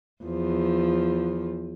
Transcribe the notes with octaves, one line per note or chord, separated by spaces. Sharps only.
E2 F3